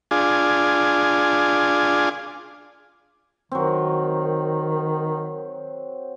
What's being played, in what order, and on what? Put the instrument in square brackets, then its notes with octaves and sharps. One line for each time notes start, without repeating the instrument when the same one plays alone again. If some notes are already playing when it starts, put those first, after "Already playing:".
[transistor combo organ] D4 F4 G#4
[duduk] D#3 [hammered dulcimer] F#3 C4